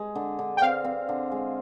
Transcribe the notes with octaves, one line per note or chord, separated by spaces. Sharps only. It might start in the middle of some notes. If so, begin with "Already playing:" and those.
Already playing: G#3
D3
D3
G5
C4 F5
C4
D3
G#3